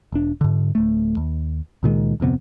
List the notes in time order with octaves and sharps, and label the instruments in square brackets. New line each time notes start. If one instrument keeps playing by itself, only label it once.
[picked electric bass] E1 D4
G#2 D3
D1 A3
D#2
C#2 A#2 D#3 G#3
D1 F2 C3 B3